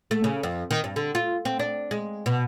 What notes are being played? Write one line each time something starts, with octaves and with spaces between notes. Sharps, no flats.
A3
C#3
F2
D#3
G2
D3
F4
C4
D4
G#3
B2